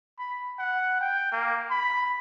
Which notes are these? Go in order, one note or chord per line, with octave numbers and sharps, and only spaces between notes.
B5
F#5
G5
A#3
B5